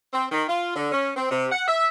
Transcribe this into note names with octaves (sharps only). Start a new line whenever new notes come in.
C4
D#3
F4
D3
C#4
C4
C3
F#5
E5